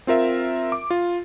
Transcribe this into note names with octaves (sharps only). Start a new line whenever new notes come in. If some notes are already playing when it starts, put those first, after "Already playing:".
C4 F4 A#4 E5
D6
F4